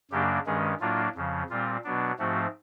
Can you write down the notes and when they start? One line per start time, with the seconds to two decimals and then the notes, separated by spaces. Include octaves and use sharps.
0.11 F#2 C#3 F#3 A#3 D4 G4
0.46 G2 D#3 G#3 C#4 G#4
0.80 A2 F#3 A#3 D4 F4
1.15 F2 C#3 F3
1.50 A#2 G3 C4 F4
1.84 B2 F#3 B3 D4
2.19 G#2 F3 A3 C4 F#4